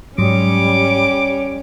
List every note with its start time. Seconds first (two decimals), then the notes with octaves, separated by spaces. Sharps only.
0.18 G#2 F#3 G3 C#4 C#5 D6